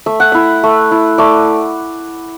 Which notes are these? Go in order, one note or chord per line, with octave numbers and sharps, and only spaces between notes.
A3 E5
F#5
E4 E5
A3
E4
A3 D5